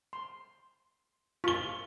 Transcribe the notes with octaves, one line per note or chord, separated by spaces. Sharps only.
C6
F4 C#6 G7